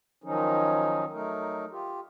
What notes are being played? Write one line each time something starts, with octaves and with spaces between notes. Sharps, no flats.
D#3 F3 F#3 C#4 D#4
F#3 A3 D#4 A#4
F4 G4